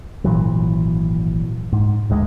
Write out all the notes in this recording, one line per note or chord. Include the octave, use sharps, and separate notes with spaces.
G#1 A#2 E3 F#3
G#2
D1 D2 G#3